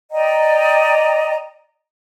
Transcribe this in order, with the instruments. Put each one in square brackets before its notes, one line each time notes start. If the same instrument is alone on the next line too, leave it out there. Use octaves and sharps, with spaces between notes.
[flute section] D5 D#5 G5 A#5